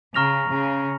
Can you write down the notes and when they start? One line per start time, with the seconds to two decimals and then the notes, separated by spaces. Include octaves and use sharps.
0.14 C#3 A#5 C#6 F6 A#6 F7
0.49 C#3